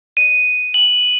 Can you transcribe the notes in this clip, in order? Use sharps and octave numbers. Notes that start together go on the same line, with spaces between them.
D#7
F#7